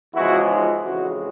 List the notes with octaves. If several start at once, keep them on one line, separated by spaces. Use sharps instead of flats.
E2 C#3 F3 G#3 E4 F#4
D#4 F4
F2 C#3 E3 G#3 E4 F#4